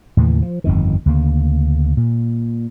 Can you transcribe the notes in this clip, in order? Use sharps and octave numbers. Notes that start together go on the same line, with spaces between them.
D#2 A2 C#3 E3
F3
G1 F2 D#3
D2 C#3 A#3
A#2